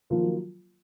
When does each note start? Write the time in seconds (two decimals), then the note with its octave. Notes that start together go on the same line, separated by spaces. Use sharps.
0.10 D#3 F3 A#3 F4 A#4
0.23 F#3